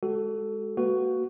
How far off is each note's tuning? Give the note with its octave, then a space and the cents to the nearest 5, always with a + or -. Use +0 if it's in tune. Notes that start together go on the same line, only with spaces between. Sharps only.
G#3 +0 F#4 +30 A4 +0
A#3 +0 F#4 +10 B4 +15